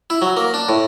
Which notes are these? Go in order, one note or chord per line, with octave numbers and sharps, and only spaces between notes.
E4
F#3
A#3
D4
A2